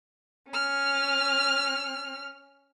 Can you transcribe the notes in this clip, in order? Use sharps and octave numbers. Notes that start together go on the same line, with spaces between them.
C#4 F6